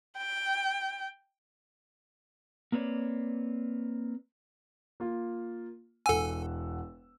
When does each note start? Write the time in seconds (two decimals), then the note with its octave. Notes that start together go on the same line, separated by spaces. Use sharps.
0.17 G5
2.72 A#3 C4 B4 C#5 D5
5.00 A#3 F4
6.06 E1 A4 F#5 G#5 E6